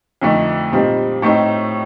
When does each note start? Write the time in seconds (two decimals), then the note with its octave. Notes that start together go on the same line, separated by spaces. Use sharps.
0.22 F2 D3 A3 D#4
0.72 A#2 G3 C4 D#4
1.22 A2 A3 C4 D#4